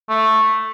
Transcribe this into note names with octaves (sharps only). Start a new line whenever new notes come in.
A3